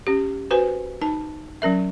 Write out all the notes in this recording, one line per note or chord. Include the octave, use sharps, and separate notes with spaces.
C#4 G4
F#4 B4 C5 G#5
D#4 A5
F#3 C#4 A#4 E5